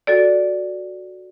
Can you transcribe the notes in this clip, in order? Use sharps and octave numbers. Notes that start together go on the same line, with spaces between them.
F#4 A4 D5